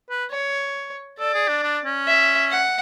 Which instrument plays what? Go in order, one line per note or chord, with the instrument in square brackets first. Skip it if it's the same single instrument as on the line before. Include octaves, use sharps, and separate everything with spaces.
[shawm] B4
[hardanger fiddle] C#5
[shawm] A4 [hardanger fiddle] D5
[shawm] G#4
D4
D4
C#4
[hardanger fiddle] E5
F#5